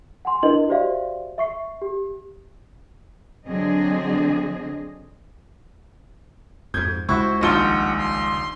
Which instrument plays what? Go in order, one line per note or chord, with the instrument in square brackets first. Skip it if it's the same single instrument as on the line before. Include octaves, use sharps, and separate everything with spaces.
[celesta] F#5 G#5 C6
D4 E4 A#4 B4 D#5 F#7
F#4 G4 C5 D5 E5 F5
E5 C#6 C7
G4
[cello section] D3 F#3 C4 D4 G#4 D#5
[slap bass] F2 G#2 [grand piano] G6 G#6
[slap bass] C#2 [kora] E4 F#4 [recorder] C5 [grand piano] C#6
[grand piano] D#1 A#1 G7 [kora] D#4 F4 D#5 [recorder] F#5
[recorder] C6